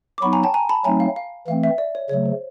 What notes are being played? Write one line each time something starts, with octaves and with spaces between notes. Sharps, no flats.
D6
F#3 B3 D#4 B5 C#6
G#5 A#5
G5 A5
G#5 A#5
A5 B5
F#3 A3 C4 D#4 G#5 A#5
F5
F5
E3 A3 C4 F5
E5
D5
C#5
C#3 F#3 A3 C#5
C5